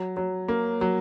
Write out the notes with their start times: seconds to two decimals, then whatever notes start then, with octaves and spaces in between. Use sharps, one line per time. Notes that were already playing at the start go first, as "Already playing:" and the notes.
Already playing: F#3
0.17 F#3
0.48 A#3
0.81 F#3